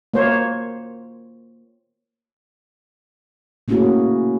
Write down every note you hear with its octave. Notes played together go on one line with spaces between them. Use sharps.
A#3 C5 C#5
A3 A#3 C#4 E4 F#4 G#4